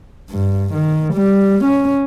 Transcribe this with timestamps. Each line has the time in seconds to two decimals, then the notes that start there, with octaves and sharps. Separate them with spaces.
0.31 G2
0.74 D#3
1.14 G3
1.65 C#4